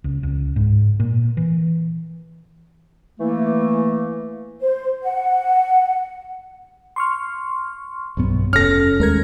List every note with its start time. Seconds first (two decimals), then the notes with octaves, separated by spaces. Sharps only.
0.04 C#2
0.23 C#2
0.56 G#2
1.00 A#2
1.37 E3
3.20 E3 A3 A#3
4.61 C5
5.03 F#5
6.96 C6 C#6 F6
8.17 B1 G2 B3
8.53 F1 C#4 A4 F6 A#6
9.00 D#2 G#3 A3 C#4 A#4 G#6